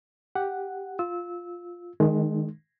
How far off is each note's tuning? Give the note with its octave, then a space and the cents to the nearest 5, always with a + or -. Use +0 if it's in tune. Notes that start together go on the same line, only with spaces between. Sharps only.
G4 +0 F#5 +0
F4 +5 E6 -20
D#3 +0 G#3 +20 D#4 -45